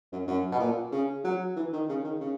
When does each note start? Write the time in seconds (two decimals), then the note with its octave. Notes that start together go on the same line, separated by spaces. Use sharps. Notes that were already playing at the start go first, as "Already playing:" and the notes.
0.12 F#2
0.27 F#2
0.52 B2
0.59 A#2
0.92 C#3
1.24 F#3
1.56 E3
1.73 D#3
1.89 C#3
2.04 D#3
2.20 C#3